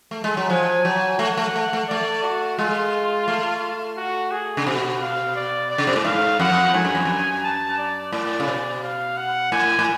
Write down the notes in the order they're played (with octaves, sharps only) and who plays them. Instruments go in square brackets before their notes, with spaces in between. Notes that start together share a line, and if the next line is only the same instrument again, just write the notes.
[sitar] A3
G#3
F#3
[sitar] F3 [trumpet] G#5
[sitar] F#3
[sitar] A3 [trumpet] F#5
[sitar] A3
A3
A3
[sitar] A3 [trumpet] D5
[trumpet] F#4
[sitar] G#3 [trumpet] F4
[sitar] A3
[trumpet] F#4
G#4
[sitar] C#3
[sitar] B2 [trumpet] F#4
[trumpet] F5
D5
D5
[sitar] C#3
B2
A2
[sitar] G#2 [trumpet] F5
[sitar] F2 [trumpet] F#5
[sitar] G#2 [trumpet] G#5
[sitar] F#2
F2
F#2
[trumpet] A5
D5
[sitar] A2 [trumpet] D5
[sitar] C#3
[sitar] B2 [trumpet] D5
[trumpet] F5
F#5
[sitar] A2 [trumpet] G#5
[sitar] A2